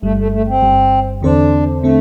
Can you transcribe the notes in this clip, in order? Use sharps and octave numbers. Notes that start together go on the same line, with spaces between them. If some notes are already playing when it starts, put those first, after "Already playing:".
G1 G2 G3 A3
A3
A3
C4
G1 G2 G3
E2 D3 C4 D4 A4 C5
D3 A3 C4 A4